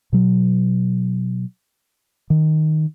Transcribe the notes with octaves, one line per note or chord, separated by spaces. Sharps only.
B2 F#3
D#3